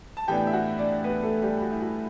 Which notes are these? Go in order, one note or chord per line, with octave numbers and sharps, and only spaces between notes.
A5
A2 E3 B3 D4 G4 G5
E5
F#4 F#5
D4 D5
B3 B4
A3 A4
G3 G4
F#4
E4
F#4